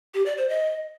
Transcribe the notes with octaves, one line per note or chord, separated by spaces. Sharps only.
G4
D5
C5
D#5